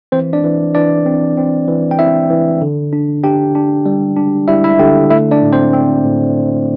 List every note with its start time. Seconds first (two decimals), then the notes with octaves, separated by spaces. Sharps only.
0.12 E3 C4 C5
0.33 D4 D5
0.44 E3
0.74 E3 D4 D5
1.06 C4
1.37 C4
1.68 E3
1.91 G5
1.99 C4 E4 E5
2.30 E3
2.62 D3
2.93 D4
3.23 D4 G4 G5
3.55 D4
3.86 G3
4.17 D4
4.48 G3 E4 E5
4.64 E4 E5
4.79 D3 G4 G5
5.10 A3 E4 E5
5.31 D4 D5
5.42 A2
5.52 C4 C5
5.73 C4
6.04 A2